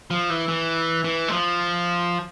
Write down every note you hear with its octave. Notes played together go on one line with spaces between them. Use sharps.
F3
E3
E3
E3
G#3
F3